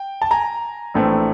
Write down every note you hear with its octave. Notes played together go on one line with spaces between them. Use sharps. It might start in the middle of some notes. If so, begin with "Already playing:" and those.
Already playing: G5
A5
G#5 A#5
A#1 A2 E3 A3 C4